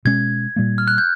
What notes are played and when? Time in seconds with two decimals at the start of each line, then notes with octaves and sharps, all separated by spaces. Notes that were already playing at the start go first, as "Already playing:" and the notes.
0.05 B2 G#3 C#4 G#6
0.56 A#2 G3 A#3
0.78 F6
0.88 F#6
0.98 G6